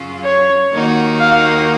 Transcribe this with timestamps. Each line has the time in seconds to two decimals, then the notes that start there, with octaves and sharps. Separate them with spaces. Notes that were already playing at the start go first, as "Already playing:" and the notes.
Already playing: F#2 C#3 F#3 C#4 F4
0.24 C#5
0.71 D#2 D#3 A#3 D#4 F#4
1.20 F5